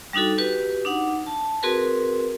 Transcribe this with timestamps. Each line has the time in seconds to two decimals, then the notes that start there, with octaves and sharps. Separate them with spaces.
0.13 G3 D4 D#4 F#4 A4
0.38 F#4 G4 B4
0.85 D4 D#4 F#5
1.26 A5
1.63 C4 F#4 G#4 A#4 B4